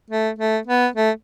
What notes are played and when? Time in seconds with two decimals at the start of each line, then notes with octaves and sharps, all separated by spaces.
0.10 A3
0.38 A3
0.67 B3
0.95 A3